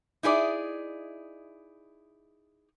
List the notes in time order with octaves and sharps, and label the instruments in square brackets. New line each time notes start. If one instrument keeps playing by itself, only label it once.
[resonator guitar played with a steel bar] D#4 E4 G#4 D5